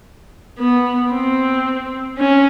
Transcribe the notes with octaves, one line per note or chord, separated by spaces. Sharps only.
B3
C4
C#4